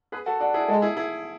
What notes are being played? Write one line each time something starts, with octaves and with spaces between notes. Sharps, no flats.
G#4 B4
F#4 A4
D4 F#4
E4 G#4
G#3 F#4 A4
E4 G#4
E4 G#4